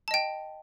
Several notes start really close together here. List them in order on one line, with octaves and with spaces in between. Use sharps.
A5 D#5 G5